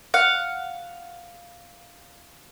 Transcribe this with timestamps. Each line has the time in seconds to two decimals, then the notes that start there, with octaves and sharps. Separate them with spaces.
0.14 F5 F#5